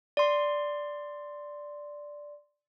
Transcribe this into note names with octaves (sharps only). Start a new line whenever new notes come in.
D5 C6